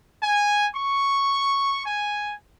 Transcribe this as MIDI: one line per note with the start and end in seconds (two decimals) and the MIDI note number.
0.20 0.67 80
0.75 1.82 85
1.85 2.35 80